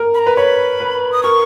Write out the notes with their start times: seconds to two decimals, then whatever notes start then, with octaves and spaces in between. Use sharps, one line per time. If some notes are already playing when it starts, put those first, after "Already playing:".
Already playing: A#4
0.14 B5
0.19 A#5
0.27 B4
0.37 C#5 B5
0.80 B4
1.12 D#6
1.23 A#4 C#6